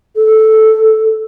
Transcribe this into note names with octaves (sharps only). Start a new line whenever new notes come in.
A4